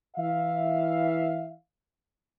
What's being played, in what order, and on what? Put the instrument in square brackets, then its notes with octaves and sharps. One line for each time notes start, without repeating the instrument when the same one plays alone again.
[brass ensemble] E3 E5 F5